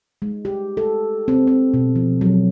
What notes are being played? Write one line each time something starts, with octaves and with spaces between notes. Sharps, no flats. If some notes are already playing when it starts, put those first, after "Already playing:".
G#3
G4
A4
C4
C4
B2
F3
F#3